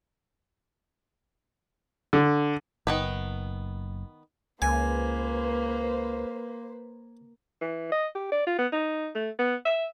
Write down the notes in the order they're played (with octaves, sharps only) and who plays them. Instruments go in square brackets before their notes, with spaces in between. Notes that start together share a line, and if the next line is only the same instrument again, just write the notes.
[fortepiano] D3
[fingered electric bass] F#1 [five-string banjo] D#3 B3 B4
[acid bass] C#2 [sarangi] A#3 [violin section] B4 C5 [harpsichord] G#5
[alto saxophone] E3
D#5
G4
D5
F4
B3
D#4
A3
B3
E5